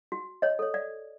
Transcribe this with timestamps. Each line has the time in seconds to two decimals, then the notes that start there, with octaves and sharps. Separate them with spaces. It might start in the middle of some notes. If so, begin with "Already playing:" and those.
0.12 F#4
0.42 C#5 D#5
0.59 A4 C#5
0.74 D5